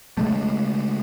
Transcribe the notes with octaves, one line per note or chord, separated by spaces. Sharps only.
C#3 G#3 A3